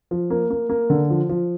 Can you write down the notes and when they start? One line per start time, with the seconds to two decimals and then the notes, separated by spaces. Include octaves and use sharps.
0.11 F3
0.30 A#3
0.50 A#3
0.70 A#3
0.90 D3
1.10 F3
1.29 F3